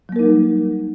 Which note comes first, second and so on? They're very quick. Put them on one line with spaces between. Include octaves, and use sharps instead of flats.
F#3 A#3 A#4 D#4 G3